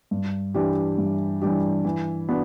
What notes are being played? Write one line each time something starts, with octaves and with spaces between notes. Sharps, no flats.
G2
E3 G3 D4 G4
G2
E3 G3 D4 G4
E3
B3 D4 F#4